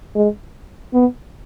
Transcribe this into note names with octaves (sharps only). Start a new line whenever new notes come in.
G#3
B3